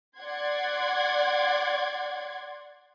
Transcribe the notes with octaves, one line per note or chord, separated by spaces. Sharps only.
D5 F#5 C6 G#6